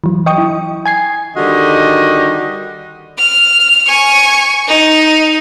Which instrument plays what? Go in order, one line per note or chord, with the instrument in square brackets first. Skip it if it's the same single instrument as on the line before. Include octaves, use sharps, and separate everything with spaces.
[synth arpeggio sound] E3 F#3
D#5 G5 C#6 D#6
E4
G#5 G#6 C7
[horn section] D3 D#3 G3 F#4 D#5
[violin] F6
G#5 C#6
D#4